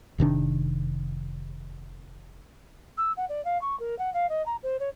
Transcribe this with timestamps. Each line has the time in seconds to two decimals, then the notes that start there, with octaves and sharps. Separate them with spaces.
0.18 F1 C3 D#3 D4
2.97 E6
3.17 F#5
3.29 D5
3.45 F5
3.61 C#6
3.79 A#4
3.99 F#5
4.14 F5
4.29 D#5
4.46 A#5
4.63 C5
4.80 C#5